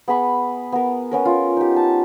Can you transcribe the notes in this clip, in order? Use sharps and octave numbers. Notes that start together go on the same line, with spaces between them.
B3 G#4 B5 C#6
B3 A#4
B3 C#4 A#4
C#4 F4
D#4 G4
A5